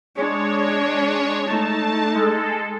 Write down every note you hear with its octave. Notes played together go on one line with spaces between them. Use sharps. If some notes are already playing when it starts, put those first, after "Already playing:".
G#3 D4 C#5
A3 D#4 A5
G#3 A4